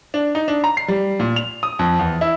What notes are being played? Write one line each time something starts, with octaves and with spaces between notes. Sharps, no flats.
D4
D#4
D4
A#5
C7
G3
A#2
F7
D#6
F2
E2
E4